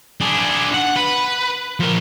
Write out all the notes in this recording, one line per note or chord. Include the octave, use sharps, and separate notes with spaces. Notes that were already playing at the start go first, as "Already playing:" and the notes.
D4 G#4
F#5
B4
F3 A#4